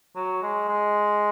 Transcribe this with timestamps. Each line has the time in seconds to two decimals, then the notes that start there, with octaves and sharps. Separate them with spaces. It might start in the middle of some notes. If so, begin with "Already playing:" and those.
0.16 F#3
0.42 G#3
0.69 G#3